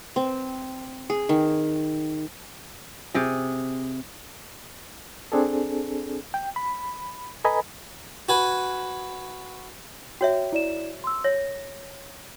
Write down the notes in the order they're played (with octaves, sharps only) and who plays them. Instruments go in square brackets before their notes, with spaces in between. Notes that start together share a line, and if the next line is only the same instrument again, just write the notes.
[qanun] C4
G#4
D#3
[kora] C3 G#4
[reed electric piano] C4 D4 G#4 A4
G5
B5
A4 B4 D#5 G#5 A#5 B5
[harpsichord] F#4 B4 G#5
[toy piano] F#4 C#5 E5 [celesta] G5
[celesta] E4 D5 E7
C6 E6
[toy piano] C#5 [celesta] A#6